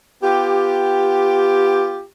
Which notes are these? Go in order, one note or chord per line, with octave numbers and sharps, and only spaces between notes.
B3 F4 G4